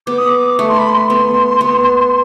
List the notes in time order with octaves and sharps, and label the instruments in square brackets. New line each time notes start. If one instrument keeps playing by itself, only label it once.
[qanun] B3 [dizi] D6
[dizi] D#6
D6
[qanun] A3 [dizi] C#6
[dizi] C6
B5
C6
[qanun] B3
B3